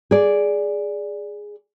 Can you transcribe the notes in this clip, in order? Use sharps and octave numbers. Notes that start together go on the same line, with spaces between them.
G#4 D5